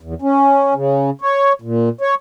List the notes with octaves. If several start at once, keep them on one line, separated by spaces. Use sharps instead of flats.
E2
C#4
C#3
C#5
A#2
C#5